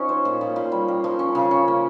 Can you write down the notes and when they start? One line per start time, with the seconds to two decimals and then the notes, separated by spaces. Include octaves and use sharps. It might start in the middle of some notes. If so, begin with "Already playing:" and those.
Already playing: F3 C#4 D#4
0.09 C5
0.25 A#2
0.41 A#2
0.56 A#2
0.72 G3
0.88 A#3
1.04 F3
1.19 C#4
1.35 C#3
1.51 C#4
1.68 A#3